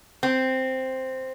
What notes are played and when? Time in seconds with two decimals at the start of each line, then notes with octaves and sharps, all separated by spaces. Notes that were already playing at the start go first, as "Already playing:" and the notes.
0.23 C4